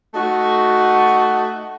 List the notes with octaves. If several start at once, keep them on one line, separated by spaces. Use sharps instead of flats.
A3 D#4 F#4